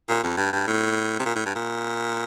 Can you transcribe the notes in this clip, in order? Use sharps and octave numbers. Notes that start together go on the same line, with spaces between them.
A#2
F2
G2
G2
A2
C3
A#2
A2
G2
A#2